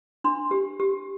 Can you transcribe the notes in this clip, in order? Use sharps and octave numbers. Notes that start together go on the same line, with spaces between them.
D4 C6
G4
G4